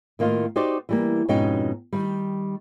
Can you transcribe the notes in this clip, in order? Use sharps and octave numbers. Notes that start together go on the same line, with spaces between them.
A2 D#3 A#3 D#4 F4
D#4 F#4 G4 C5 D5
E3 G3 A#3
F2 G#2 B2 C#4 D#4 G5
D#3 G3